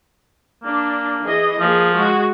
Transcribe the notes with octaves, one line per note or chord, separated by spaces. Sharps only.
A#3 D4
E3 G#4 D#5
F3 A#3 G#4
G#3 F#4